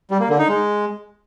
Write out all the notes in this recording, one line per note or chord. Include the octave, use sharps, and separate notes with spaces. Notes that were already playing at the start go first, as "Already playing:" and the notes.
G3
A#3
D3
D#4
G#3